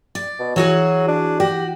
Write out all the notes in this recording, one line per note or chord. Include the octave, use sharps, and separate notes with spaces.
D5
B2
E3 F#3 F#4 G#4
D4
F#4 G4